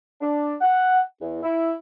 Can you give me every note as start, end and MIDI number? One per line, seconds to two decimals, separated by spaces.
0.21 0.53 62
0.61 1.01 78
1.21 1.39 40
1.42 1.72 64